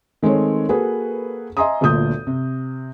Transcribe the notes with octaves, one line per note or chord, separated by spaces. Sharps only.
D#3 G#3 A3 C4 C#5
A#3 F#4 G#4 A4 B4
D#5 E5 G#5 A#5 C6 D#6
G1 D2 A#2 D#6 G6
C3